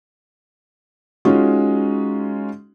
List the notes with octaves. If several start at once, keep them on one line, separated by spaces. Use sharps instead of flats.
G#3 C#4 D#4 F4 F#4